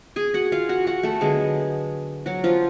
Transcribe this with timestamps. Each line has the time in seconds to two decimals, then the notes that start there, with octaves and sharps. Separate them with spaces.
0.16 G#4 G#5
0.34 F#4 F#5
0.52 F4 F5
0.69 F#4 F#5
0.87 F#4 F#5
1.03 A3 A4
1.21 D3 F#3 G#3 B3 G#4
2.26 F#3 F#4
2.44 F3 F4